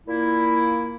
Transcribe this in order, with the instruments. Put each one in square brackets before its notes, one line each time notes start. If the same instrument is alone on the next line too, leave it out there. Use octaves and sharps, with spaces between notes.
[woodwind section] A#2 A#3 E4